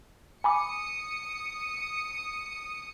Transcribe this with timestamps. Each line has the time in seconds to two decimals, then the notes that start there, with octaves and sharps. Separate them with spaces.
0.44 G#5 B5 D6 D#6 C#7